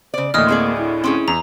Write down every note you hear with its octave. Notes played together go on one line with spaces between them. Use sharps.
C#3 C5 D5
D2 A2 E3 A#3 D#5 D#6 F6
C4 G#4 D5
E4
C4 C#4 G#4
E2 A#5